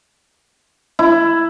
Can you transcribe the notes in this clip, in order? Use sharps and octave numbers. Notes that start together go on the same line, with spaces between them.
E4